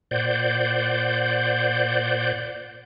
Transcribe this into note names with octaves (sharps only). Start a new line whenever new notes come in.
A#2 C5 D5 F#5 G6